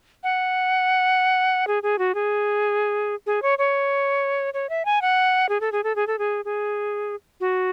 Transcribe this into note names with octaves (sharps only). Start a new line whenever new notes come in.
F#5
G#4
G#4
F#4
G#4
G#4
C#5
C#5
C#5
E5
G#5
F#5
G#4
A4
G#4
A4
G#4
A4
G#4
G#4
F#4